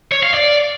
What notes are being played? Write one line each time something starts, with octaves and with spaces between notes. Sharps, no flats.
C#5
F5
D5